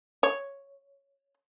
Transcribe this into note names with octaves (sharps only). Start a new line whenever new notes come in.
C#5